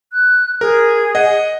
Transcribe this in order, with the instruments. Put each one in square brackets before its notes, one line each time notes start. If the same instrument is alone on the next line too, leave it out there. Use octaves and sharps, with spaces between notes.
[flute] F#6
[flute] G#4 [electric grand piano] A#4
[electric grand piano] D#5 F#5